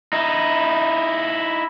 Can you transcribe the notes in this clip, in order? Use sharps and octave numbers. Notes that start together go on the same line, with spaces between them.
D#4 E4